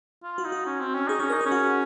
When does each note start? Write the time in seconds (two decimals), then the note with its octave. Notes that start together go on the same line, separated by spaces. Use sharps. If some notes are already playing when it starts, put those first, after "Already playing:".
0.23 F4
0.38 F#4
0.45 D#4
0.52 F#4
0.66 C#4
0.80 C4
0.94 C#4
1.07 D#4 G#4
1.19 C#4 G#4
1.30 A#4
1.33 D#4
1.41 G#4
1.46 C#4
1.52 F#4